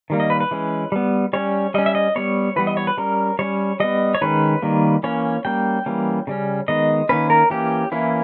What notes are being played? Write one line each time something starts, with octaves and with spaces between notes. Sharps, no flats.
D#3 G3 A#3
D#5
B4
B4
E3 G#3 C#4
G3 B3
G3 C#4 C#5
G3 C#4 D#5
E5
D#5
G3 B3 C#5
E3 G3 B3 B4
D#5
C#5
B4
G3 C#4 A#4
G3 C#4 C#5
G3 B3 D#5
C#5
D#3 G#3 C#4 B4
D#3 G3 A#3
E3 A#3 C#4 C#5
G3 A#3 C#4 G5
E3 G3 A#3 C#4
C#3 G3 C#4
D#3 G#3 B3 D#5
D#3 A#3 C#4 B4
A#4
E3 A#3 C#4 G4
E3 A#3 C#4 E4